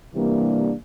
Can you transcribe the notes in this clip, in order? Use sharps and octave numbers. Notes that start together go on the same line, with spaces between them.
C3 E3 G3 A#3 D4